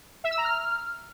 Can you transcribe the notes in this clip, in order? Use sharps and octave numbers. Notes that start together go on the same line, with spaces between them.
E5
E6
A#5
F6